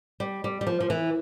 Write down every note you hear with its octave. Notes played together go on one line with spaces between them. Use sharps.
G3
G3
G3
F3
F3
E3